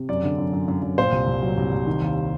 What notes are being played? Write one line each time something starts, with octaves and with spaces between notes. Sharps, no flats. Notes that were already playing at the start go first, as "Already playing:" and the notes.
Already playing: C3
F#2 D5
D3
F#2
F#2
F#2
F#2
A#2 C5
C2
C2
F#3
C2
C2
D#3
D#2